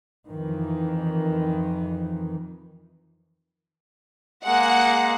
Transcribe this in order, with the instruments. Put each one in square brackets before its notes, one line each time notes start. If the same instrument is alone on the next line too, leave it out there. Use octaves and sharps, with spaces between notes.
[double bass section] F2 D#3 E3
[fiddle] G#3 A#3 [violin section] F#5